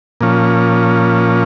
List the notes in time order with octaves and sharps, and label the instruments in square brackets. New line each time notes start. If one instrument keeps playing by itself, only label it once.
[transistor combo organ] A#2 F3 C#4